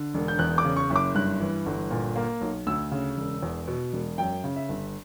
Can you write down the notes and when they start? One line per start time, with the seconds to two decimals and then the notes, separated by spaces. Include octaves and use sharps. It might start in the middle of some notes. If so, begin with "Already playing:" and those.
Already playing: D3
0.14 E1
0.28 G6
0.39 E2 F#6
0.58 D6
0.65 C#3
0.76 C#6
0.90 F#1
0.96 D6
1.15 G2 F#6
1.40 E3
1.66 G1
1.91 A#2
2.16 A#3
2.41 B1
2.67 D2 E6
2.92 C#3
3.17 E1
3.42 E2
3.68 B2
3.93 E1
4.18 F#2 G5
4.44 C#3
4.56 E5
4.69 G1